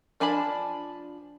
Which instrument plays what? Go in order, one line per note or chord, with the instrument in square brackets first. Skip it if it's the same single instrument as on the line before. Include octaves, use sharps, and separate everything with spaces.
[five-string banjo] F3 D4 G#5 A5 B5